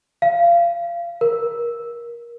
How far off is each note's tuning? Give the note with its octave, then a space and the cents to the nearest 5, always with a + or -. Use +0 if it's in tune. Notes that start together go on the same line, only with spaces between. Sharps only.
F5 -25
A#4 +20